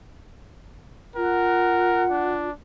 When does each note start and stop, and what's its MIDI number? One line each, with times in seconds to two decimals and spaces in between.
1.16 2.48 65
1.16 2.04 70
1.16 2.30 78
2.10 2.52 62